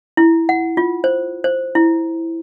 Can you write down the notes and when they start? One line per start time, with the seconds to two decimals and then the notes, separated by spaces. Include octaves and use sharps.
0.17 E4
0.49 F#5
0.77 F4
1.04 C5
1.44 C5
1.75 E4